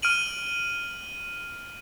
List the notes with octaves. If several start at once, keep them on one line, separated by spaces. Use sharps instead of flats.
F6 D7 D#7 F#7